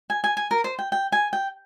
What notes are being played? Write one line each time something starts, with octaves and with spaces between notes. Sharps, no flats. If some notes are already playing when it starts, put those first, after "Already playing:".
G#5
G#5
G#5
A#4
C5
G5
G5
G#5
G5